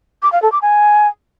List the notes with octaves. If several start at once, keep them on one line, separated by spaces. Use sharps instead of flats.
D6
F5
A4
D6
G#5